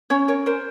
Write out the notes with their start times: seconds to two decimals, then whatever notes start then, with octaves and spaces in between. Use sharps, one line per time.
0.10 C#4 C#5
0.28 A#4 C#5
0.46 A#4 C5